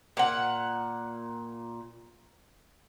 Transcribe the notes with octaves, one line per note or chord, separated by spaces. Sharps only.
A#2 F#5